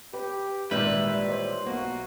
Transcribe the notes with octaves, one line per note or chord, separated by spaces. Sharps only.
G4 B4
G#1 A#2 D#3 E3 G3 B4 E5 G6
C5 C#5
B1 A#3 F#4